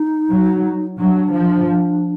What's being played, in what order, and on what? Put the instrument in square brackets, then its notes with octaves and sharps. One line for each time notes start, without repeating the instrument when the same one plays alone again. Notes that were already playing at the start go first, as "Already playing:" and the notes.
Already playing: [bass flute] D#4
[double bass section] F#3
[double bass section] F#3 [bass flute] D4
[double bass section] F3